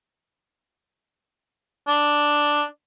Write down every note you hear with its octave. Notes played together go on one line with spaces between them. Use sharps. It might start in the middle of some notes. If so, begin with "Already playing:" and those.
D4